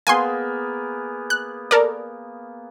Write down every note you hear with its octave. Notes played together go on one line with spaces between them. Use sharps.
A#3 B3 G#4 G#5 C6
F#6
A4 A#4 D5